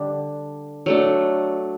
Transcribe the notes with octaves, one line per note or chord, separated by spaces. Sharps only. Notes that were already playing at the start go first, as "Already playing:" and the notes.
Already playing: D3 G3 D4
F#3 A3 D4